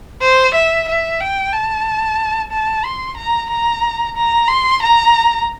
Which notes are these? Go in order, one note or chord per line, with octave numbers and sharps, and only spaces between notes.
C5
E5
E5
G5
A5
A5
C6
A#5
A#5
A#5
C6
A#5